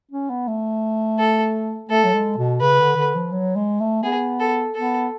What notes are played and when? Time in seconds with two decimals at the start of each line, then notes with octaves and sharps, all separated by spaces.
0.12 C#4
0.30 B3
0.48 A3
1.19 A4
1.89 A3 A4
2.04 F#3
2.14 G#3
2.38 B2
2.61 C#3 B4
2.80 D3
2.97 D3
3.15 F3
3.32 F#3
3.56 G#3
3.80 A3
4.04 B3 G#4
4.40 A4
4.75 B3 A4